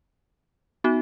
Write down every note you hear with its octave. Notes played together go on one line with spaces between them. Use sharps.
B3 D#4 F#4